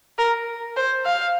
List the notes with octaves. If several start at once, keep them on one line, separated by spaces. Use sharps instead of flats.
A#4
C5
F5